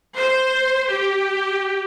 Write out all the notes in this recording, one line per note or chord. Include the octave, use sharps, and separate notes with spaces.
C5
G4